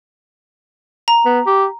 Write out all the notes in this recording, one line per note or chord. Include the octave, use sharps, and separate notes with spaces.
A#5
B3
G4